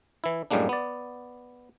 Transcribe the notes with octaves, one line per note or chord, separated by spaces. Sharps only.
E3 E4
F#2 A2 G3 G#3 A#3 D4
B3 D5